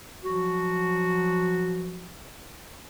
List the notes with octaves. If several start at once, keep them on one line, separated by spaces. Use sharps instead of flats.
F3 F#3 F#4